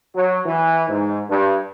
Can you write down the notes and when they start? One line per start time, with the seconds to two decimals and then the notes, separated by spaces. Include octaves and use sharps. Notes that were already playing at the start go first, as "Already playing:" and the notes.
0.15 F#3
0.46 E3
0.89 G#2
1.29 G2